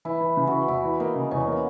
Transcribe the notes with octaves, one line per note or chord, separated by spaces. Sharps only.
E3 E4
E3
C#3
E3 F#4
E2 E4
E3
A#3 D#4
C#3
E2 C#4
A#3 B3